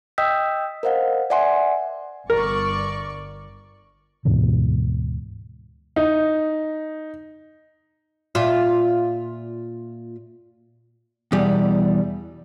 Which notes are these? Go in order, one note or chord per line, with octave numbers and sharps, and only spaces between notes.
D#5 G5 D#6 E6 G6 B6
A#4 C5 D#5 F5 F#5
D5 E5 F#5 G#5 C6
G1 A#4 D5 C#6
D2 G#2 B2 E3
D#4
A#2 F4 E5
E2 B2 G3